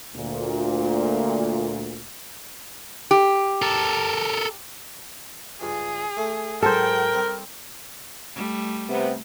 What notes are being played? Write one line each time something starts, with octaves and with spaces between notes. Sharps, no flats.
D2 A#2
G4
A4 A#4
C#2 G2 G#4
A3
G#2 F#3 G#3 A4 A#4 C5 G5
G3 C4
G3 A3
C3 B3